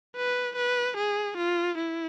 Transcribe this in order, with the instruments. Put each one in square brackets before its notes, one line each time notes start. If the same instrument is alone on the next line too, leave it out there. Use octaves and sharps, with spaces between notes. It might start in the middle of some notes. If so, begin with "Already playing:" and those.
[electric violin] B4
B4
G#4
F4
E4